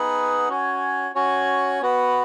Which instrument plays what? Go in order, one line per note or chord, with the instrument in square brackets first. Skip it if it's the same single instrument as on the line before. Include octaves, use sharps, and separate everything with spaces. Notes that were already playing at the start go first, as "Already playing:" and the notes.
Already playing: [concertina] B3 D#4 G#4 B4 F#5
C#4 F#4 C#5 G#5
C#4 F#4 C#5 G#5
B3 F#4 B4